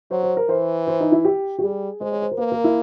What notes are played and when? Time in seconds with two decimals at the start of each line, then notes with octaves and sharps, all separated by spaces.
0.11 F#3 C5
0.23 C5
0.37 A#4
0.49 E3 C5
0.87 C5
1.00 D#4
1.12 E4
1.25 G4
1.59 G4
1.62 G3 G#4
2.01 G#3 C5
2.12 C#5
2.22 C5
2.31 A#4
2.38 A#3 B4
2.52 A#4
2.64 E4